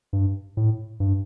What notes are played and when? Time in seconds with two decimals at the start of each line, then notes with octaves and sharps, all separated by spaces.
0.13 G2
0.57 A2
1.00 G2